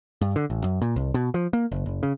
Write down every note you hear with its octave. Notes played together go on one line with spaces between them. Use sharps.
G2
D3
A1
F#2
A#2
C2
B2
F3
A#3
F#1
F#1
C#3